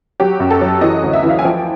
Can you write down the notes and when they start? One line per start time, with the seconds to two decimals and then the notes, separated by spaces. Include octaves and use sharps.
0.20 F#3 G4
0.40 F#2
0.50 A4
0.61 F#3
0.81 E3 D#5
1.03 D2
1.13 E5
1.23 E3
1.30 F5
1.39 G#5
1.44 F3 G5